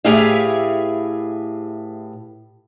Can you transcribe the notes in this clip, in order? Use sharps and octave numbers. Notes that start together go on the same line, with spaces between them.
A2 G4 G#4 B4 E5 F5